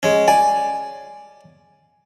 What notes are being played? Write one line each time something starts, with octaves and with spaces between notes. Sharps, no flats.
G#3 C#4
D5 G#5